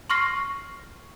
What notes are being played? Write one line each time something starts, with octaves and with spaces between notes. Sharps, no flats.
C6 C#6 F6 A#6 C7